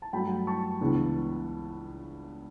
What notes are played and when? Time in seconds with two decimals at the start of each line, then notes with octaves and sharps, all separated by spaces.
0.02 A5
0.13 G2 F#3 A3 G5 B5
0.47 A5 C#6
0.80 C#2 C#3 E3 B3 D4